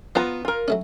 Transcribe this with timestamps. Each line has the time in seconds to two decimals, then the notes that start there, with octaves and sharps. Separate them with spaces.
0.15 F3 B3 F4 C5 A#5
0.45 F4 A#4
0.68 F#3 A3 C#4